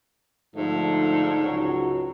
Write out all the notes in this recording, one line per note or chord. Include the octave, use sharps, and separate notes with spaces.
G#2 D3 F3 A3
C#2 F#3 F#4